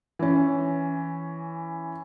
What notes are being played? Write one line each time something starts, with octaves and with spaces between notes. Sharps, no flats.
E3 C#4